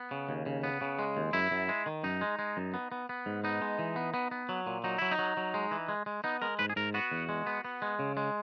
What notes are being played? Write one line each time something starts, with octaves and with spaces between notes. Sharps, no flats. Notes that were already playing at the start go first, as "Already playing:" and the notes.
Already playing: B3
C#3
D#2
C#3
B3
C#3
G#3
D#2
F#2 E4
F#2
G#3
D#3
F#2 D#4
G#3
G#3
F#2
B3
B3
B3
G#2
B3 D#4
G#3
E3
B3
B3
B3
F#3
A#2
F#3 D#4
F#3 E4
D#4
F#3
F#3
G#3
E3
G#3
G#3
B3 D#4
G#3 A#4
G#2 B4
G#4
G#2 A#4
B3 F#4
E2
G#3
B3
B3
G#3
C#3
G#3